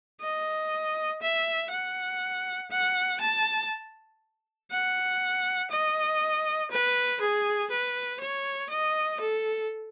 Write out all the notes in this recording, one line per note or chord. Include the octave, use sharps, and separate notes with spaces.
D#5
E5
F#5
F#5
A5
F#5
D#5
B4
G#4
B4
C#5
D#5
A4